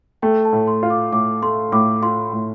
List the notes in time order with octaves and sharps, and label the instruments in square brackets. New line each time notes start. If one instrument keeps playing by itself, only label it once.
[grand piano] A3 [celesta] G5
[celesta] A5
[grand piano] A2
[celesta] C6
[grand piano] F4
[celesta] D6
[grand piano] A2 [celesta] D6
[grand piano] A3 [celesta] C6
[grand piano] A2 [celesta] D6
[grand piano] F4 [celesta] C6
[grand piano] A2